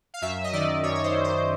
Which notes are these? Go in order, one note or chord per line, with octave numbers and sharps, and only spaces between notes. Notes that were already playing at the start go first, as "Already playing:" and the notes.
F5
F#2 E5
D#5
D#3 D5
F#2 C#5
C#5
C5
D#3
C5